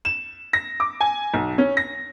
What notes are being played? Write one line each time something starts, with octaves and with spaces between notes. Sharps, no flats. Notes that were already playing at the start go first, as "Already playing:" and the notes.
E7
A#6
D6
G#5
B1
C#4
A#6